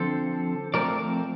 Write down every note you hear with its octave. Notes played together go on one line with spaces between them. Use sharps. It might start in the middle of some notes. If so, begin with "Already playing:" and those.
Already playing: D3 F3 C4 A4 C5
F3 A3 C4 A#4 D5